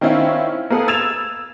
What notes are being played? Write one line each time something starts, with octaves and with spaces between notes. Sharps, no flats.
D#3 C4 C#4 E4 F4
A#3 B3 G#4 A4 B4
E6 G#6 A6 E7 F7